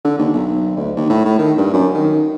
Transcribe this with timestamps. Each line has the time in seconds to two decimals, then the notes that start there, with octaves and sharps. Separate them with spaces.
0.04 D3
0.18 D#2
0.33 B1
0.77 D2
0.96 D#2
1.10 A2
1.25 A2
1.38 D#3
1.58 G2
1.74 F#2
1.94 D#3